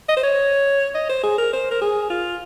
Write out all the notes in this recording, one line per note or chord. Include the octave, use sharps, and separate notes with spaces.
D#5
C5
C#5
D#5
C5
G#4
A#4
C5
A#4
G#4
F4